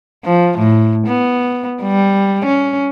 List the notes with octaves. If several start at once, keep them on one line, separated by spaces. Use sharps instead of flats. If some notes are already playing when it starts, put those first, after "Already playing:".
F3
A2
B3
G3
C#4